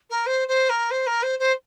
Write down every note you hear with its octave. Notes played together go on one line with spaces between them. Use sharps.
A#4
C5
C5
A#4
C5
A#4
C5
C5